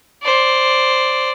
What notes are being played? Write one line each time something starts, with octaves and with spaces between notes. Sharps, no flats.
C5 D5